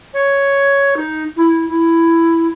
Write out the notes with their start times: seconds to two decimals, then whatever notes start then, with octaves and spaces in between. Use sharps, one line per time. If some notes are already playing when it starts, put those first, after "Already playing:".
0.14 C#5
0.97 D#4
1.36 E4
1.69 E4